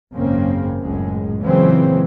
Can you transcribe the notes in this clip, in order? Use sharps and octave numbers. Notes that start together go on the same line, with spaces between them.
G#1 F#2 C#3 A#3 C4
F#1 C#2 F#2 A2 G#3
A#2 C#3 E3 F#3 G#3 C4